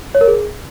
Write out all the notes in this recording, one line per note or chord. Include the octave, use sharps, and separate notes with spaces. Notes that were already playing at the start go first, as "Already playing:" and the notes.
C#5
A#4
G#4